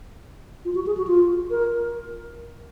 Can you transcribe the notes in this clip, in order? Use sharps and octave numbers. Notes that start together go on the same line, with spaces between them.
F4
F#4
G#4
F#4
F4
A#4